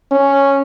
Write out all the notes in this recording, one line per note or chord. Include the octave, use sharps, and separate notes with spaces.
C#4